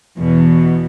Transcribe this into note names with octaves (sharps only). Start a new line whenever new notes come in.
E2 B2